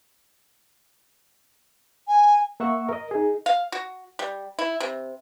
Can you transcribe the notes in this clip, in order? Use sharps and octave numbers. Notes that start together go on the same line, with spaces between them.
G#5
A#3 E5 F#5 C#6 E6
A#4 D#5
D#4 G#4
F5
F#4
G3
E4
C3